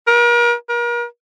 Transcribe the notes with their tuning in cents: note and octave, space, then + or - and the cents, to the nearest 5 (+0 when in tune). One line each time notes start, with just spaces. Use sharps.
A#4 +40
A#4 +40